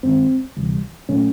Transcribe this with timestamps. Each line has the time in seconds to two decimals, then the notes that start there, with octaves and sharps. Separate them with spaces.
0.03 G2 D#3 G#3 C4
0.57 D2 C3 E3 G3
1.09 A#2 F#3 A3 C#4